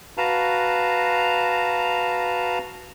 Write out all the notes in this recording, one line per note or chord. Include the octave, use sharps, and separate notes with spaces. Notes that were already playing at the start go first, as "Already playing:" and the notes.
F#4 B4 F5 A5 A#5